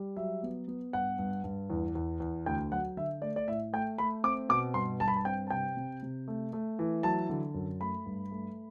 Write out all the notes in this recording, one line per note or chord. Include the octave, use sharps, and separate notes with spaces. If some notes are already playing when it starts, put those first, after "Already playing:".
Already playing: G3
F#3 E5
B3
B3
G2 F#5
G2
G2
E2
E2
E2
D2 G5
F#3 F#5
D3 E5
A3 D5
D5
A2 E5
A3 G5
A3 B5
C4 D6
B2 D6
G2 C6
G2 A5
B5
A5
C4 G5
A5
C3 G5
C3
C3
A3
A3
E3
F#3 A5
D3
F#2
A3 B5
G2
A3